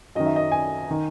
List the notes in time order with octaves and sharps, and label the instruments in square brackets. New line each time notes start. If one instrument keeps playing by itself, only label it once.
[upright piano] F#2 D#3 D#5
E5
D#5
G#5
D#3